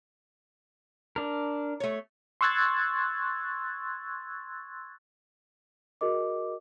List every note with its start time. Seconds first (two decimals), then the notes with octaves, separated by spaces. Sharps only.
1.16 D4 A#4
1.80 A3 C#5
2.41 C6 C#6 E6 F#6 G#6 A6
6.01 F#4 G#4 A#4 D#5 D6